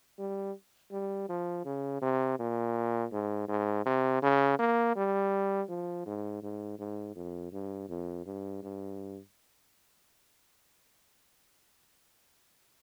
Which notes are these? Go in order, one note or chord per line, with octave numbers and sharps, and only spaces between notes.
G3
G3
F3
C#3
C3
A#2
G#2
G#2
C3
C#3
A#3
G3
F3
G#2
G#2
G#2
F2
G2
F2
G2
G2